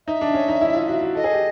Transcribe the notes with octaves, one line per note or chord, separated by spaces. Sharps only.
D#4 E5
D4
C#4
D#4
E4
F4
F#4
F#4
A4 D#5
G#4
G4